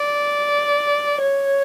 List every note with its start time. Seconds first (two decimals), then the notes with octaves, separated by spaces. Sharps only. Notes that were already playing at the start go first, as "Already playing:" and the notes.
Already playing: D5
1.21 C#5